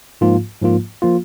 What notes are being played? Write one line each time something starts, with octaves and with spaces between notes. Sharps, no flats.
G#2 F3 A#3 F4
G#2 F3 A#3 F4
F3 A#3 F4